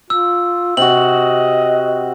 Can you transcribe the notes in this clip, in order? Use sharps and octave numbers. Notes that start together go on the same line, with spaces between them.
F4 E6
C3 F#4 D#5 F#7